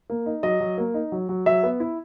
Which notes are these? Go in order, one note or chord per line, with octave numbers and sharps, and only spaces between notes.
A#3
D#4
F#3 D#5
F#3
A#3
D#4
F#3
F#3
F#3 E5
B3
E4